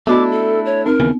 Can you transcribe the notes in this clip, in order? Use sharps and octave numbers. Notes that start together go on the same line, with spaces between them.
A3 B3 D4 E4 F#4 D#5 D6
A4
C#5
C4 D#4 A#4
D#2 C#3 E3 B3